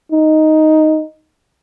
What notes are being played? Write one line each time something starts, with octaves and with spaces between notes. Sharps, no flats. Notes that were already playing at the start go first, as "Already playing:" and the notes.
D#4